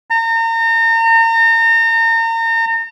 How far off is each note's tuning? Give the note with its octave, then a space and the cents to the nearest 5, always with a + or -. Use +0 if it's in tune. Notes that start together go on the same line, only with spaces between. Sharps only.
A#5 -35